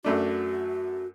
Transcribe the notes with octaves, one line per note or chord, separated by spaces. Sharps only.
F#2 A3 D4 F#4